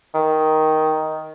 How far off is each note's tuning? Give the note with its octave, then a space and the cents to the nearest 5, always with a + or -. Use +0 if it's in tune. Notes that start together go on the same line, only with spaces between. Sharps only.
D#3 +10